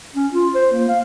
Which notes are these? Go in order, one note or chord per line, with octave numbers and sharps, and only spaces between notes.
C#4
F4
C5
A#3
F5